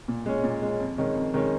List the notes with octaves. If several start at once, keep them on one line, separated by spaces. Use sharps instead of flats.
A#2
G#3 C#4
A#2
G#3 C#4
F2
D#3 G#3 C#4
F2
D#3 G#3 C#4